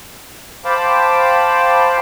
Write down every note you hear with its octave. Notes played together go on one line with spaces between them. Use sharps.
C5 F5 G5 A5 B5 D6